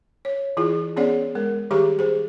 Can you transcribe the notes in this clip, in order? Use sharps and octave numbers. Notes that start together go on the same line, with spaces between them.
C#5
E3 E4 F4 G#4
B3 C#4 G#4 C#5 D5 F#5
G#3 A#4
D#3 G3 G4 G#4 A#5 C#6
G#4 C5